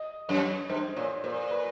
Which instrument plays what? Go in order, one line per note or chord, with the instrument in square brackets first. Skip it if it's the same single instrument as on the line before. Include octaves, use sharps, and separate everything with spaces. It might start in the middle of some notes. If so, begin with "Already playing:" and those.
Already playing: [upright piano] D#5
[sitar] F#2 [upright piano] C#5
[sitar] G2 [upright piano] C5
[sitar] A#2 [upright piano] C#5
[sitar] A#2 [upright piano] C5
[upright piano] B4